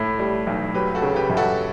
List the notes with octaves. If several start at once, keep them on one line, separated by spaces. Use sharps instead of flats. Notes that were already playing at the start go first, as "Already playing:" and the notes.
Already playing: A2 A3
G3
B1
F#3 G4 B4
F#4 A4
C#3
G4 B4
F#2
F#4 A4